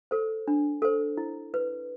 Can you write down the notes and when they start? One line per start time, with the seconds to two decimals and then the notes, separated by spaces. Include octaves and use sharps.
0.11 A4 C5
0.48 D4
0.82 A4 C5
1.17 E4
1.54 B4